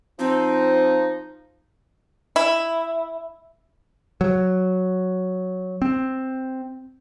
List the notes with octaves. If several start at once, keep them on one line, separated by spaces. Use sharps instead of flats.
F3 C4 D#4
E4
F#3
C4